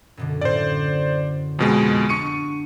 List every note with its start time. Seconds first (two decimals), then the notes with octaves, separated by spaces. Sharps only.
0.17 F#2 B2 D3
0.41 A2 D3 C#4 C5 D5
1.59 F2 B2 G#3 B3 F4 G4
2.09 D4 C#6 C#7 D#7